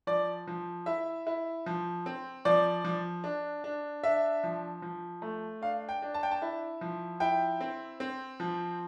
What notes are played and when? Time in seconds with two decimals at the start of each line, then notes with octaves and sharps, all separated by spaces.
0.07 F3 D5
0.47 F3
0.86 E4 E5
1.27 E4
1.66 F3
2.06 C4
2.45 F3 D5
2.85 F3
3.24 D4
3.64 D4
4.03 D4 E5
4.44 F3
4.82 F3
5.22 A3
5.62 D4 F5
5.89 G5
6.02 D4
6.14 A5
6.23 G5
6.31 A5
6.42 E4
6.81 F3
7.20 E4 G5
7.61 C4
8.00 C4
8.40 F3